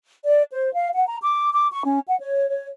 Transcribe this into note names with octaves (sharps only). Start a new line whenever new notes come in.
D5
C5
F5
F#5
A#5
D6
D6
C#6
C#4
F#5
C#5
C#5